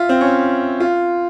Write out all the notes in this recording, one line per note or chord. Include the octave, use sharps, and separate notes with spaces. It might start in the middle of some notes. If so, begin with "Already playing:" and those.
Already playing: F4 E5
C4
C#4
F4